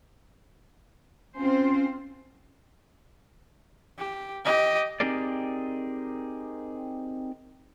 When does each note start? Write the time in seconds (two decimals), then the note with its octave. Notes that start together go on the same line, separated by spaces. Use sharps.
1.37 C4 C#4 F4 C5
3.99 G4
4.45 G4 D#5
5.00 C4 D#4 G4 G#4 A#4 D5